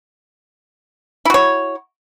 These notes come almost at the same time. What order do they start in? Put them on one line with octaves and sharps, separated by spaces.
E4 F#4 C#5